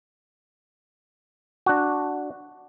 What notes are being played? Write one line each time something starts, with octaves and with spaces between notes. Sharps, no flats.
D4 F#4